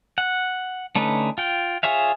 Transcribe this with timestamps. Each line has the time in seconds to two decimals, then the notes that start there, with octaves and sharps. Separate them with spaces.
0.18 F#5
0.95 D3 A3 C#4 D#4 B4
1.38 F4 G5
1.83 F4 G#4 C#5 E5 F5